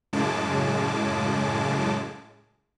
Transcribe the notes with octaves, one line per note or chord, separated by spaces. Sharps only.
F#2 A2 C#3 G#3 A5 D6